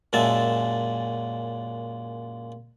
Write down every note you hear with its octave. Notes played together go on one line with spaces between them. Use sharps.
F#2 A#2 G#3 E5 A5